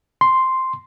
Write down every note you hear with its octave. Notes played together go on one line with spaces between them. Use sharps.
C6